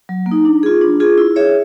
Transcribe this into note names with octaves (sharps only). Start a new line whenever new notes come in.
F#3
A#3
D#4
D4
F4 G#4
D4
F4 G#4
E4
G#4 C#5 E5